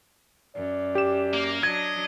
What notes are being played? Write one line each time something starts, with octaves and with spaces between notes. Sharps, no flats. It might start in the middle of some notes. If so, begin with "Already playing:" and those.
F#2 D5
G4 E7
A#3
F#3 D4 D#5 G#6